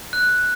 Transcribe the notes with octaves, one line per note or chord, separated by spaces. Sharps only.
F#6